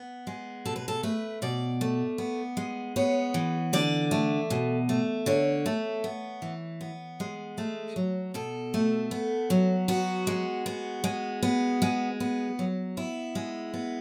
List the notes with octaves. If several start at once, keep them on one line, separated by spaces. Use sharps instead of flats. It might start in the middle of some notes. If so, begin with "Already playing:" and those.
Already playing: B3
G#3
B2 A4
B4
A4
A3 B4
B2 D5
A3
B3
G#3
B3 C#5
E3
D3 D5
A3
B2
A3
D3 C#5
A3
B3
E3
B3
G#3
A3
F#3
B2 A4
A3
B3
F#3
B3 F#4
G#3
B3
G#3
B3
G#3
B3
F#3
B3 E4
G#3
B3